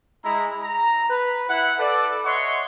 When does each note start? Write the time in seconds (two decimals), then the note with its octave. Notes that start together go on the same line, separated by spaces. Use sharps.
0.24 G#3 E4 A#5
0.62 A#5
1.10 B4
1.49 E4 F#5
1.79 A4 B4 D5
2.25 C#5 D#5 E5 F#5 C6 C#6